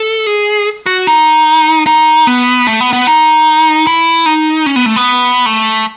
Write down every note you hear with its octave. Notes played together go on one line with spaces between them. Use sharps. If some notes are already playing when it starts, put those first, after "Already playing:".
Already playing: A4
G#4
F#4
D#4
D#4
B3
A3
B3
B3
D#4
E4
D#4
C#4
B3
A3
B3
A3